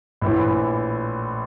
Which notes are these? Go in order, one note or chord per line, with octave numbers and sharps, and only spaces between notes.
A#1 A2 E3